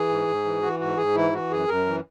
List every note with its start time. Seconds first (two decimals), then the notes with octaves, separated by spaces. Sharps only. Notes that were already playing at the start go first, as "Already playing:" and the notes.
Already playing: E3 G#4
0.09 G#2
0.28 G#2
0.45 E3
0.62 E3 F#4
0.80 G#2 F#4
0.97 G#2 G#4
1.15 E3 E4
1.33 E3 F#4
1.50 F#2 G#4
1.68 F#2 A#4
1.86 E3